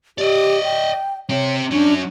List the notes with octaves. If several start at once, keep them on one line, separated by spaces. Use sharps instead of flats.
G4 D5 D#5
G5
C4 G4 C#5
F#3 C#4 D4